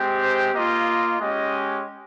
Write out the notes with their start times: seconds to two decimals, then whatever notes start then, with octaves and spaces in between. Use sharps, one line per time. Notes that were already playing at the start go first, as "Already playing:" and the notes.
Already playing: G#3 C4 G4
0.22 C5
0.54 A#3 F4 D#5
1.19 G#3 C#4 G4 D#5